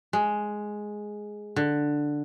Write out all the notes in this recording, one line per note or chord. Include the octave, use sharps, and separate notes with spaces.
G#3
D3